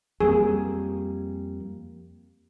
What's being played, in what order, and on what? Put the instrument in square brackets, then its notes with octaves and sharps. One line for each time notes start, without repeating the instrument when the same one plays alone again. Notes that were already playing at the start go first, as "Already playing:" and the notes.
[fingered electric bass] F2 G3 A#3 [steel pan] G#4